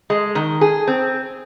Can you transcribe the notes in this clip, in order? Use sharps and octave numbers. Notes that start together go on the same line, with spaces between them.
G#3
D#3
G#4
C4